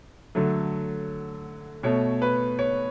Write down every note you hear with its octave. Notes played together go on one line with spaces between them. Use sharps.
D3 F#3 A3
B2 A3 C#5
B4
C#5